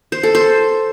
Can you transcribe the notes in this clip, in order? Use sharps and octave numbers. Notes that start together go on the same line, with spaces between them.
C5
A4
C5